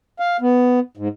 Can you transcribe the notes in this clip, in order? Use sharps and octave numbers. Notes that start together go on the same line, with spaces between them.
F5
B3
G#2